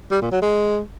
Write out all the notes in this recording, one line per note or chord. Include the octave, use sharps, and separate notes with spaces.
G3
A#2
F#3
G#3